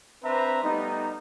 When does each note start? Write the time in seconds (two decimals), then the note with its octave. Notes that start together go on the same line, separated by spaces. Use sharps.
0.23 C4 D4 B4 C5 E5 A#5
0.62 G3 A3 B3 D#4